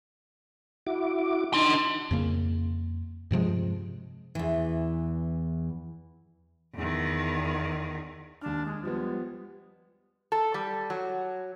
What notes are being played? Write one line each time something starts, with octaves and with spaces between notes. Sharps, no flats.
E4 F#4 D6
D4 D#4 C6
F2 C#3 A#3
G2 C3 F3 G#3
E2 E3
E2 D#3
D#2 D4 F6
G#3
F3 G3 G#3 B3
A4
G3
F#3